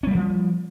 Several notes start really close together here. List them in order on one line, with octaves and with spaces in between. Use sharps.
C#4 G3 A#3 F3